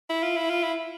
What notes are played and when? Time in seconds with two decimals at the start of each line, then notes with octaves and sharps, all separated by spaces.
0.10 E4
0.23 F4
0.36 E4
0.50 F4
0.63 E4